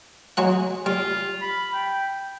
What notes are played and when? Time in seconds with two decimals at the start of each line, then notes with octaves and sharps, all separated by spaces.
0.37 F#3 G#3 F#5
0.86 G3 F4
1.41 B5
1.74 G5